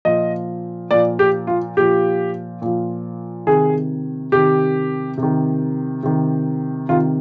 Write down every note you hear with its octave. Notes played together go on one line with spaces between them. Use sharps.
A#2 F3 D#5
A#2 F3 D5
G4
F4
A#2 F3 G4
A#2 F3
C3 D#3 G#4
C3 D#3 G4
C3 D#3
C3 D#3
C3 D#3 F4